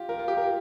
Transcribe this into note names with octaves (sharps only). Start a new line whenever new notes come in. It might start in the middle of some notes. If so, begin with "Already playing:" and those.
Already playing: F4 G4
A#4
F4
G4
A#4